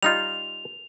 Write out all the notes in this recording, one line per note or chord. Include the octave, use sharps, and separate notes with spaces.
G3 D#4 F4 F7